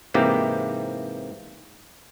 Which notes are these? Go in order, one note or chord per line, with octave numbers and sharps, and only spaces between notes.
G#2 C3 E3 A#3 G4